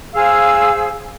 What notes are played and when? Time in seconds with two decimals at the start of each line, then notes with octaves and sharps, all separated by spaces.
0.13 G#4 C5 F5 E6